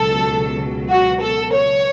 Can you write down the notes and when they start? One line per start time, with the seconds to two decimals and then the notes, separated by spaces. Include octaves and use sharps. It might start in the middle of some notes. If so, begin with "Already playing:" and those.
Already playing: C#2 B2 F#3 A4
0.89 F#4
1.22 A4
1.54 C#5